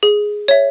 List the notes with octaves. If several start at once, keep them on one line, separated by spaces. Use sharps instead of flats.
G#4
C#5 E5